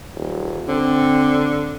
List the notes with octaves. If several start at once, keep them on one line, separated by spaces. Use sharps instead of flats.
D#1
D3 C4